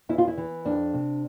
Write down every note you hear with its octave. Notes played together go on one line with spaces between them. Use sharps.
E2 E4
F4
E4
E3
F2 D4
C3